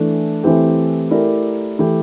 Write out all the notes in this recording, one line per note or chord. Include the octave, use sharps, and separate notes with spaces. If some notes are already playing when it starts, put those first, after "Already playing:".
Already playing: E3 A3 D4
E3 A3 C4 E4 G4
A3 E4 G4 A#4 D5
E3 A3 E4 G4